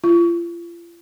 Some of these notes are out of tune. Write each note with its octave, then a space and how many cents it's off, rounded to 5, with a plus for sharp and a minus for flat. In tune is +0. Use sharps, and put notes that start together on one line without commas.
F4 -35